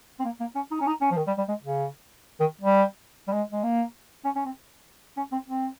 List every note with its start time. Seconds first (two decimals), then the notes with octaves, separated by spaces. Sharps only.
0.19 C4
0.24 A#3
0.40 A#3
0.55 C#4
0.71 D#4
0.81 C#4
0.87 D#4
1.01 C#4
1.11 F3
1.17 D#3
1.27 G3
1.38 G3
1.48 G#3
1.63 C#3
2.40 D#3
2.61 G3
3.27 G3
3.32 G#3
3.52 G#3
3.63 A#3
4.24 C#4
4.36 C#4
4.45 C4
5.17 C#4
5.32 C4
5.48 C4